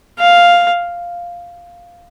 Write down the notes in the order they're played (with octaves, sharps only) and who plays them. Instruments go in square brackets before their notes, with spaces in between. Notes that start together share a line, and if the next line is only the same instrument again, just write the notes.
[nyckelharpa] F5